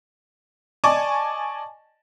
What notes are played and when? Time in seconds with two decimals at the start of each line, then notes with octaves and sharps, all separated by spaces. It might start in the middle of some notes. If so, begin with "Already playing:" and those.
0.84 D5 D#5 G#5 A5 C#6 D6